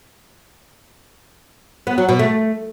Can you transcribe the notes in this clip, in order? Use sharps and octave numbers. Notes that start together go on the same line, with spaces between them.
B3
F#3
B2
A3